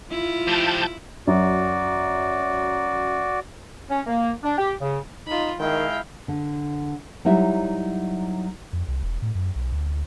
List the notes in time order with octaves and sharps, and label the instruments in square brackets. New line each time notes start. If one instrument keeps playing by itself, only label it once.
[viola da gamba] E4 [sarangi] F4
[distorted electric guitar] F3 G4 [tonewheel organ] A5 G6
[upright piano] F#2 [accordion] F#4 D5
[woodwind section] C#4
A#3
D4
G4
C#3
[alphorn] D#4 [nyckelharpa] F4 B5
[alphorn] D#3 [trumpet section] G#3 E4 F5 [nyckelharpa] G5
[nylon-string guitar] D3
F#3 G3 D#4 E4 E5
[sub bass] F2
C2
E1
A2
F#2
B1
D2